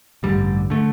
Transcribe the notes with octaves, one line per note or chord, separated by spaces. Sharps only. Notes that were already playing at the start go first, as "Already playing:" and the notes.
A1 G2 D3 G3
D3 A3